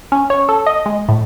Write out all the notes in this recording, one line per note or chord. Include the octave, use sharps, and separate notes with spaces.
C#4
C#5
A4
D#5
G#3
A2